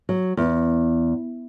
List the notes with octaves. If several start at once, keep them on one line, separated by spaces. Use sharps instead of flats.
F#3
E2